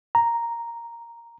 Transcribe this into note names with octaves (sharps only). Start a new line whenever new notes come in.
A#5